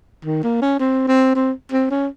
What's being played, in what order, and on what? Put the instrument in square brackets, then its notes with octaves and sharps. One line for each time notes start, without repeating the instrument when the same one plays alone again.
[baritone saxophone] D#3
A#3
C#4
C4
C4
C4
C4
C#4